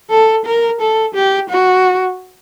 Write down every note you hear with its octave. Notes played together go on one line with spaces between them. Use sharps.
A4
A#4
A4
G4
F#4